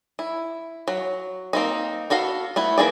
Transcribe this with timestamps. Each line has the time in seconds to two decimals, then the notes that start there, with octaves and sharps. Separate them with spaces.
0.19 E4
0.88 F#3
1.53 A#3 C4 D#4
2.10 B3 F#4 A4 F5
2.56 A3 B3 E4
2.78 E3 A#3 G#4 D5